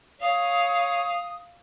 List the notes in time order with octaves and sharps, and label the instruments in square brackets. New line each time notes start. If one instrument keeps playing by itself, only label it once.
[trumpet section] C#5 [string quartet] F5 [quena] D#6